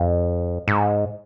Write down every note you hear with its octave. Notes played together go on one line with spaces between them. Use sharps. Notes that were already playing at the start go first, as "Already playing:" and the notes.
Already playing: F2
G#2